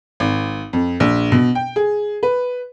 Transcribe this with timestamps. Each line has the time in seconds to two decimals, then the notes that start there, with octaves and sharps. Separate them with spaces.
0.20 G#1
0.73 F2
1.00 A#1
1.32 B2
1.55 G5
1.76 G#4
2.23 B4